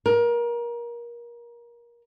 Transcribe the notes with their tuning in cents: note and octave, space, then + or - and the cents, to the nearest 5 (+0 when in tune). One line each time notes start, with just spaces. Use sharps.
A#4 +25